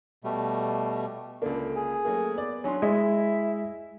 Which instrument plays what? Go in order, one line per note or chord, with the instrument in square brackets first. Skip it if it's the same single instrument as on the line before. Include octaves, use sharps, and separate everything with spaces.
[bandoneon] B2 G3 A3
[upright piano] C#2 A#3 [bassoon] D3
[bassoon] G#4
[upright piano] F#3 A3 A#3
B3 D5
[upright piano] F#3 D4 C6 [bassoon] C#4
[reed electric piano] G#3 G#5 [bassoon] E4 [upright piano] D#5